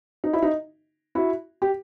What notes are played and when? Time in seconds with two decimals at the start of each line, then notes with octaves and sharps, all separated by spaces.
0.24 D#4
0.33 E4
0.42 D#4
1.15 E4 F#4
1.62 G4